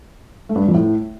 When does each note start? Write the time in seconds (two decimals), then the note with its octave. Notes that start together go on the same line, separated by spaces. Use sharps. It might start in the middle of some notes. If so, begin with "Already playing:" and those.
0.49 A3
0.55 G2
0.62 G3
0.68 F2
0.74 A2